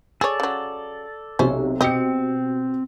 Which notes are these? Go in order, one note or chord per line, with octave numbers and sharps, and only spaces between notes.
G#4 A4 C#5 D5
C#3 F#3
B1 C3 C#4 C5
B2 C4 G4 D#5 C#7